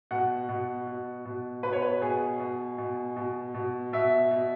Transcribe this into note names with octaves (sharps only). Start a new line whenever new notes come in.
B2 F#5
B2
B2
B2
B2 B4
C#5
B4
B2 G#4
B2
B2
B2
B2
B2 E5
B2